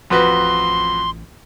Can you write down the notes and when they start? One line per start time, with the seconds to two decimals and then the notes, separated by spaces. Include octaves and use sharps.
0.10 A1 F2 F#4 B4 C6